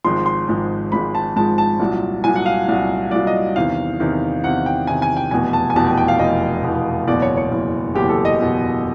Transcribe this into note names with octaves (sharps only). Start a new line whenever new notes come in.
G#1 G#2 F3 G#3 C6
C6
G#1 G#2 F3 G#3
G#1 G#2 F3 G#3 B5
A5
G#1 G#2 F3 G#3 A5
A5
C2 A#2 F#3
C2 A#2 F#3 G#5
F#5
F5
C2 A#2 F#3
C2 A#2 F#3 D5
D#5
E2 C3 D#3 F5
E2 C3 D#3
E2 C3 D#3 F#5
G5
E2 C3 D#3 G#5
G#5
G5
F1 E2 B2 G#5
A5
G#5
F1 E2 B2 A5
G5
G5
F5
F1 E2 B2 D#5
F1 E2 B2
F#1 E2 B2 D5
C#5
C#5
F#1 E2 B2
F#1 E2 B2 G4
A4
D#5
F#1 E2 B2